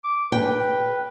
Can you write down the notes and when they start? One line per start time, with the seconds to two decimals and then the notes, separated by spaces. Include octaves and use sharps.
0.04 D6
0.32 B4 G5